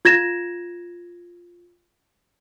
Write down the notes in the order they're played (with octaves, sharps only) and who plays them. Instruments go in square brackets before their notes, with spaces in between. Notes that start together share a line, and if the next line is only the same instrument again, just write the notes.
[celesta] F4 G#6 A#6 E7